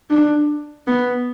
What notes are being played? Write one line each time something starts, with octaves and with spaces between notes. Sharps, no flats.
D4
B3